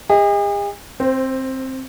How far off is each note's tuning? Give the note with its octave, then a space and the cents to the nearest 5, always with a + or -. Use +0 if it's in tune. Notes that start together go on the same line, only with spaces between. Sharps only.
G#4 -45 D#5 +20
C4 +10 C5 -15